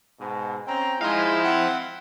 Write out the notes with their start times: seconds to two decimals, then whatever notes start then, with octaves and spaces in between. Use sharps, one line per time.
0.19 G#2 B2
0.67 C4 C#4 G5 A#5
1.01 G#3 D#4 E4 C5 F5
1.44 C4 F#5